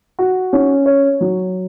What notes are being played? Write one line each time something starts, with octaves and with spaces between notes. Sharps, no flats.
F#4
C#4
C#5
F#3